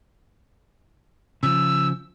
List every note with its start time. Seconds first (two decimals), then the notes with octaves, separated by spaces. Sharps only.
1.43 C#3 F3 E6